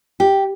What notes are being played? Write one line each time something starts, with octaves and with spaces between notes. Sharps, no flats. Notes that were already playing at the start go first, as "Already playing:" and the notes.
G4